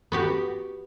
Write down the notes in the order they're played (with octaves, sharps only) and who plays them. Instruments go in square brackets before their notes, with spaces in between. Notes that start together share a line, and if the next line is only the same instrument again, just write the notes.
[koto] B3 F#4 G4